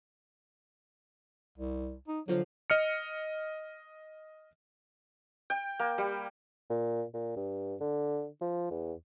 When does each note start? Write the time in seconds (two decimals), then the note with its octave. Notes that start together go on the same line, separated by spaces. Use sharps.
1.58 C2
2.08 D#4
2.28 D3 F3 F#3 F5
2.70 D#5 F6 C#7
5.50 G5
5.79 A#3
5.98 G3
6.70 A#2
7.13 A#2
7.36 G2
7.80 D3
8.41 F3
8.70 E2